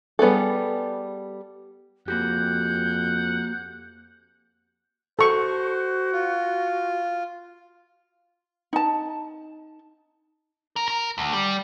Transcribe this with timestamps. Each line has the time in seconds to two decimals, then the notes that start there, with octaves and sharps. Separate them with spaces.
0.19 G3 B3 G#4 A4
2.08 F2 A#3 F#4 G4 F#5 G6
5.19 F#4 A4 C5 C#6
6.13 F4
8.73 D#4 A5
10.76 A#4
10.88 A#4
11.18 D2
11.33 G3